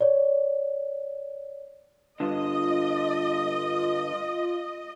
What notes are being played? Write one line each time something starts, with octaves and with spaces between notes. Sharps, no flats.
C#5 D5
G2 D3 F4 D#5